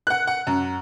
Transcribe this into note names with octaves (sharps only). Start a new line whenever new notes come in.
F#5 F#6
F#5
F#2